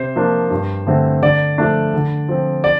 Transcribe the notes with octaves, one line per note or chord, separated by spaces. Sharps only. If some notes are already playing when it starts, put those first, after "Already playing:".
Already playing: C3 C5
F3 A#3 D4
G2
D3 A3 C4
D3 D5
F3 A3 D4
D3
F3 C4
D5